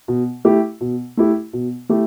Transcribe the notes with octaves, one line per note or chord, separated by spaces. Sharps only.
B2
A3 E4 G4
B2
A3 E4 G4
B2
A3 E4 G4